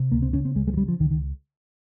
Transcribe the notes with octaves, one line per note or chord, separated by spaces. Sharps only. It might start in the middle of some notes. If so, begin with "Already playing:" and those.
Already playing: C3
C#2 A#3
C4
C#3 C#4
C4
C#2 G#3
G#3
F3
C#3 G3
F3
C#2 D#3
D#3